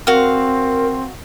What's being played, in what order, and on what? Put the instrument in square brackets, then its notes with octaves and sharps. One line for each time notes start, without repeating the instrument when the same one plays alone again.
[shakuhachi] C4 [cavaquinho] F#4 F5 [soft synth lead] A#4